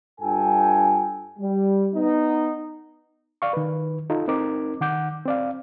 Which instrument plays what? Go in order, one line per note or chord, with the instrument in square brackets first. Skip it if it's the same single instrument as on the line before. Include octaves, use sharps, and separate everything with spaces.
[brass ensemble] G2 F4 A4 G5 G#5
G3
B3 D#4
[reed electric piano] D5 F5 C#6
D#3 B4
D#4 F4 A4
C4 D#4 A#4 D6
D#3 F#5 D6 G6
C4 D5 F5